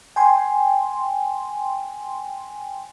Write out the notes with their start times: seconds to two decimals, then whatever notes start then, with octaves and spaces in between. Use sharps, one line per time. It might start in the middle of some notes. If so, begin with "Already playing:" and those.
0.16 G5 G#5 C6